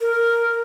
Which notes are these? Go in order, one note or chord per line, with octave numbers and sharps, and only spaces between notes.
A#4